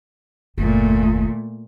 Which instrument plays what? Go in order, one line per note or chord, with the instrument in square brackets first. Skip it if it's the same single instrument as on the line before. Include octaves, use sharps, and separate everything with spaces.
[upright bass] F#1 D#2 [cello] A#2 A3